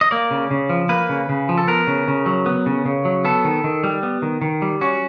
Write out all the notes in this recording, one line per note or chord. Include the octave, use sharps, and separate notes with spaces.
D#5
A#3 D5
C#3
C#3
F3
A#3 B4
C#3
C#3
F3
A4
B3 A#4
C#3
C#3
F#3
B3
C#3
C#3
F#3
B3 A4
D#3
D#3
G3
B3
D#3
D#3
G3
C#4 F#4